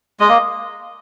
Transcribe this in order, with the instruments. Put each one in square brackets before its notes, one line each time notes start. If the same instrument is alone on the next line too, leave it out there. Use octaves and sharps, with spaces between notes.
[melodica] G#3 [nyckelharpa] D#5
[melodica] A#3